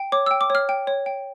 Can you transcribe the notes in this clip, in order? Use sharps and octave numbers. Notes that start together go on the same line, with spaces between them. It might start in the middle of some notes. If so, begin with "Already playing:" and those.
Already playing: G5
C#5 D6
G5 E6
D6
C#5 F6
G5
C#5
G5